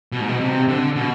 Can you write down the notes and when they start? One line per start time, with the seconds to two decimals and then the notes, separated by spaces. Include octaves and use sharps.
0.12 B2
0.21 G#2
0.29 B2
0.41 C3
0.68 D3
0.96 B2